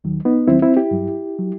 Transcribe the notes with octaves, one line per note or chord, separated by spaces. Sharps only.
D#2 D#3 F#3
B3 D#4
D#2 D#3 F#3 C4 E4
C4 E4
E4 G4
G2 F#3
F#3